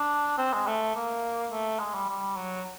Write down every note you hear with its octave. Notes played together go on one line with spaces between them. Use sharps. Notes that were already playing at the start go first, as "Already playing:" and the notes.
Already playing: D4
C4
G#3
A3
A#3
A3
G#3
G3
G3
F#3